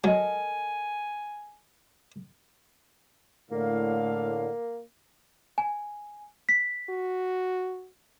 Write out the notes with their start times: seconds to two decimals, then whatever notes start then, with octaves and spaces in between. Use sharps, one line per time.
0.04 F#3 A4 A#4 D#5 G#5
3.51 A2 D3 A#3 F5
5.58 G#5
6.49 B6
6.90 F#4